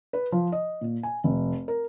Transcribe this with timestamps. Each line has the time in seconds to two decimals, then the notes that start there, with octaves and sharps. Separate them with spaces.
0.13 B4
0.32 F3
0.52 D#5
0.81 A#2
1.03 G#5
1.24 F1
1.68 A#4